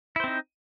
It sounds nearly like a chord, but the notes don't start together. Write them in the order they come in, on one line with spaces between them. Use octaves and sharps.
E4 C5 C4 D#4